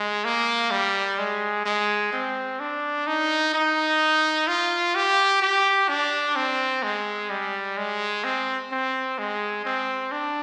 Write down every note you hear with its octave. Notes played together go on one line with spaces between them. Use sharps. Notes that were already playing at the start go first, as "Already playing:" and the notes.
Already playing: G#3
A#3
G3
G#3
G#3
C4
D4
D#4
D#4
F4
G4
G4
D4
C4
G#3
G3
G#3
C4
C4
G#3
C4
D4